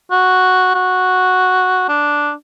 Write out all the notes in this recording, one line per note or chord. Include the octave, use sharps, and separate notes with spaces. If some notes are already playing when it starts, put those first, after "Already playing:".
F#4
F#4
D4